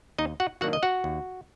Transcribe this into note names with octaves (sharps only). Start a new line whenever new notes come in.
D#2 D#4 D#5
F#4 F#5
D#3 F#3 A#3 D4 F#4 F#5
D#5
F#4 F#5
D#2